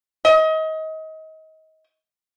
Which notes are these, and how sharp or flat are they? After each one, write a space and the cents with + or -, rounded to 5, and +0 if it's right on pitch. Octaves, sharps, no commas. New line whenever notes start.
D#5 +30